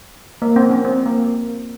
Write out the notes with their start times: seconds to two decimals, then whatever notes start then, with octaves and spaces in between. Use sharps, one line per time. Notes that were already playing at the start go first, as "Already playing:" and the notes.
0.42 A#3
0.56 C4
0.70 C#4
0.85 C4
1.06 A#3